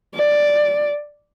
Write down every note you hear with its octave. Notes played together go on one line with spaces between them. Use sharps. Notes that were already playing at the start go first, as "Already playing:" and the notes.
D5